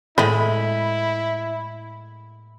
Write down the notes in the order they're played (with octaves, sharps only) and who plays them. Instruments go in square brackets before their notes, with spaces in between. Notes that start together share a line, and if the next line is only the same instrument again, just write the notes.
[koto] A2 G#3 [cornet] E4 [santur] B5